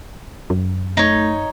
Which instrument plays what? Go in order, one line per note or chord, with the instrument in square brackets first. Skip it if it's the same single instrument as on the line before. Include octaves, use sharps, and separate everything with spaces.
[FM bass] F#2
[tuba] A3 [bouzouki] D#4 C#5